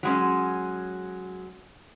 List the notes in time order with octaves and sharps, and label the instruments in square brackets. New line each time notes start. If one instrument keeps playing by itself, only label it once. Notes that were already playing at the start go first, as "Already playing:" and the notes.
[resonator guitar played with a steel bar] F#3 G#3 C#4